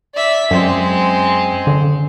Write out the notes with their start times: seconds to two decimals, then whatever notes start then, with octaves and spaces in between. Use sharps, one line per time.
0.14 D5 E5
0.51 F#2 G#3 C4
1.67 D3